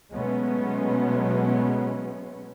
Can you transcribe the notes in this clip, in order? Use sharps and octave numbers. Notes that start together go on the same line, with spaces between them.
B2 F#3 G#3 A3 B3 C#4